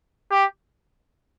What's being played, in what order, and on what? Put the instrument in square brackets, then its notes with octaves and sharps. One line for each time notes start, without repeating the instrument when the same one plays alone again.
[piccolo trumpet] G4